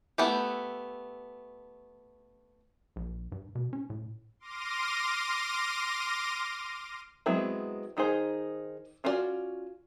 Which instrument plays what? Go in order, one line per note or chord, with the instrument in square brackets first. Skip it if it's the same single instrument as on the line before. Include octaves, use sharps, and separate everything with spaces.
[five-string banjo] A3 B3 E4 G4
[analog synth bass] A#1
G2
B2
C#4
A2
[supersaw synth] C6 D6 F6 A#6 D#7
[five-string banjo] F#3 G#3 B3 C4 E4
D#3 D#4 G#4 C5
C#4 F4 F#4 B4 D5